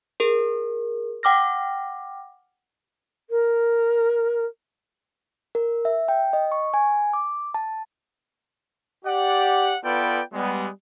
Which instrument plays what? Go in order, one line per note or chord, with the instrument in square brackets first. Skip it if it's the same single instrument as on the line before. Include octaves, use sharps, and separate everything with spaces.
[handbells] G#4 A#4
F#5 G5 D6 F6 A#6
[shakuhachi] A#4
[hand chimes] A#4
E5
G5
D#5
C#6
G#5
D6
A5
[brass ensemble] G4 D5 F#5
B3 F4 A4 B4 D5 G5
G3 G#3 B3